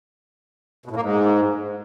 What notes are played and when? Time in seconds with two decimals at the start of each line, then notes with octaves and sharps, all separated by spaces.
0.86 B2
0.91 A2
0.96 A#3
1.01 G#2